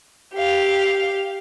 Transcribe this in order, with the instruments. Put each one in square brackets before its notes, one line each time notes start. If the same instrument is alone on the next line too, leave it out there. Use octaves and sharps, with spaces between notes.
[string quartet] G4 F5